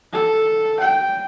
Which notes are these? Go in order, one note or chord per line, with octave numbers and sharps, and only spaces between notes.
A4
G5